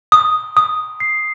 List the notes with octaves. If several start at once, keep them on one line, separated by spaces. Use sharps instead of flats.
D#6
D#6
C7